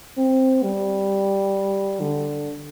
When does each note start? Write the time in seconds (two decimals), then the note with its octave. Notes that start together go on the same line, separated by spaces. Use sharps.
0.17 C4
0.63 G3
2.01 D3